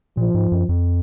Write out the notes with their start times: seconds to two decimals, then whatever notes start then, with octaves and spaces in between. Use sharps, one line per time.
0.17 A#2 F3
0.35 G#2
0.52 F#2
0.69 F2